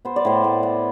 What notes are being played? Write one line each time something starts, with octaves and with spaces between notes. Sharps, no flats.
B3 C5
D5
A2 C5
A2
B3